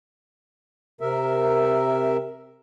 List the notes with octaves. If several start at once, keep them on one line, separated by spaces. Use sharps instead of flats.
C3 A#4 E5